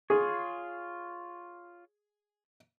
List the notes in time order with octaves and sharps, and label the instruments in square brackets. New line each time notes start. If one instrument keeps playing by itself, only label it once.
[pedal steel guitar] F4 C#5 [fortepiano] G#4